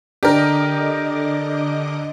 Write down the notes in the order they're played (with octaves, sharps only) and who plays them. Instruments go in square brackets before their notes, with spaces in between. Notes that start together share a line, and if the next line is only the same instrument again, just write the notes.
[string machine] D3 D#5 D6 [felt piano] D4 [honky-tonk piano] G4 A#4